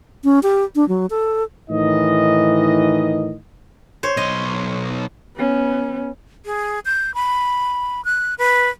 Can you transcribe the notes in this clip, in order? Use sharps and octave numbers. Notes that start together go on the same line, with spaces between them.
C#4
G4
D4
F#3
A4
A2 D#3 E3 D#4 D#5
C5 C#5
B1 D#5 C6
B3 C#4
G#4
G6
B5
F#6
B4